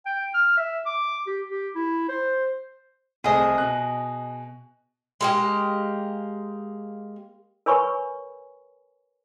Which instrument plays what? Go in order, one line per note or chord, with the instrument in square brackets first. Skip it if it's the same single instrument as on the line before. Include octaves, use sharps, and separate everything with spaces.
[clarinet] G5
F6
E5
D6
G4
G4
E4
C5
[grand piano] C2 A3 C5 [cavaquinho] G#4 D#5
[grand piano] B2 F#6
[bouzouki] G#3 A#3 G4
[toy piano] A#4 B4 C#5 G#5 B5 C#6